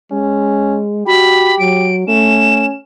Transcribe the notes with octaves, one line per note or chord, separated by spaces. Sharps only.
G#3 C#4
F#4 G4 B5
F#3 D7
A3 C#4 E7